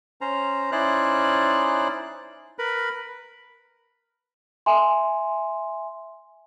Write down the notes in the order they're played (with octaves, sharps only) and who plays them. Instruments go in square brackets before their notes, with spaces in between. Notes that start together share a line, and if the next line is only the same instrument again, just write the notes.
[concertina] C#4 C5 A#5
C#4 D#4 E4 C5 D5 F#6
A#4 B4 B5
[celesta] E5 G#5 C6